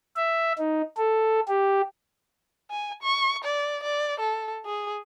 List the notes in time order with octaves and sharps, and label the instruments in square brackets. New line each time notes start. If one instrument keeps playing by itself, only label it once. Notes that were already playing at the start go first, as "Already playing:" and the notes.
[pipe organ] E5
D#4
A4
G4
[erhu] G#5
C#6
D5
D5
A4
G#4